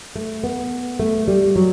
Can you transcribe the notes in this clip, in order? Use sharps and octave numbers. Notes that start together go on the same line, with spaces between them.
A3
B3
A3
G3
F#3